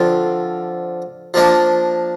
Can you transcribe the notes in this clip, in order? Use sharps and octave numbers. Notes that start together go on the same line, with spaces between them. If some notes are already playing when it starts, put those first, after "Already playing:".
Already playing: D3 F3 C4 F4
F3 A#3 D4